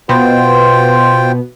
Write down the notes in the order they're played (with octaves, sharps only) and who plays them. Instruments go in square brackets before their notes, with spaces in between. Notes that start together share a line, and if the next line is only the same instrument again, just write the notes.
[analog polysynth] B2 B3 [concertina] F4 C5 G5